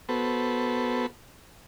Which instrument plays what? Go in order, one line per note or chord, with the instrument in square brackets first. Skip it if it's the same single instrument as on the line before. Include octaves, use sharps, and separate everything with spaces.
[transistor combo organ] B3 F#4 A4 B4 C5